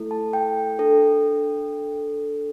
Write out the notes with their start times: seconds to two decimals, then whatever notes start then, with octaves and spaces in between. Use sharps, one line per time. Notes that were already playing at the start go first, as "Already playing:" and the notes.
Already playing: A3 E4 A4
0.11 A5
0.33 G5
0.79 D4 A4